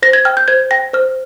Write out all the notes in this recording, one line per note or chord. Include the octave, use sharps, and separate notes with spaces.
C5 A#6
G#6
G5 F6
G6
C5 G#6
G5 A#6
C5 F6